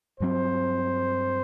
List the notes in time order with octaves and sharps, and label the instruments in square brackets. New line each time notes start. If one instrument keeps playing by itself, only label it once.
[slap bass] G2 F#3 C4 [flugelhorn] C5